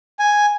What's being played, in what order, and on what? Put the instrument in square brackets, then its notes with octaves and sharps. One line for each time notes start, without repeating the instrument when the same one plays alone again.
[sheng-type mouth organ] G#5